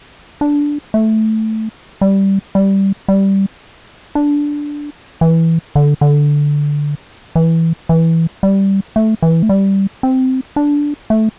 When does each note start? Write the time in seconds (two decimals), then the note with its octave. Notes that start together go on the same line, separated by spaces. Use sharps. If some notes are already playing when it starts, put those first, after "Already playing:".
0.41 D4
0.94 A3
2.01 G3
2.55 G3
3.08 G3
4.15 D4
5.21 E3
5.75 D3
6.01 D3
7.36 E3
7.89 E3
8.43 G3
8.96 A3
9.22 E3
9.43 A3
9.49 G3
10.03 C4
10.56 D4
11.10 A3